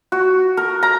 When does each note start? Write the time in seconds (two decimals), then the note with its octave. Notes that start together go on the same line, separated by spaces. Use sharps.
0.12 F#4
0.57 A#4
0.83 A#5